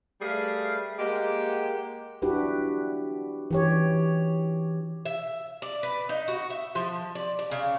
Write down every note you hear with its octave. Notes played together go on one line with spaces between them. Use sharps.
G3 A3 G#4 B4 F5
G#3 A#3 G4 F#5 G5
D4 E4 F#4 G4 B4
E3 G4 C#5
E5
D5
B4
D#4
F#4
E5
F3
D5
D5
C#3